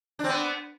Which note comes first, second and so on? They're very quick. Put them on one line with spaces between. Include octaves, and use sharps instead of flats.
D4 C4 B3